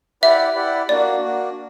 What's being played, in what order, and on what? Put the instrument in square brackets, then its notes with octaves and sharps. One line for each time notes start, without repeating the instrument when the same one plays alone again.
[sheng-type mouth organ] E4 G4 B4 D5 F#5 [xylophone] E5
[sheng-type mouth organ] E4 G4 B4 D5 F#5
[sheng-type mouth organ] A#3 D4 F#4 [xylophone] D5
[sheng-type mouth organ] A#3 D4 F#4